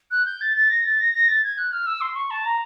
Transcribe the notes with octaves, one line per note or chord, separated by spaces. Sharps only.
F#6
G6
A6
A6
A#6
A6
A#6
A#6
A6
G#6
F#6
F6
E6
C6
C#6
A5
A#5